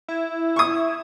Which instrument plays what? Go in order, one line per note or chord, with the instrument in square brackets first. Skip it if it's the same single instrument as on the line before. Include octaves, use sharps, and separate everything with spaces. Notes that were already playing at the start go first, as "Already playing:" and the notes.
[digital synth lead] E4
[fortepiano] C#6 D#6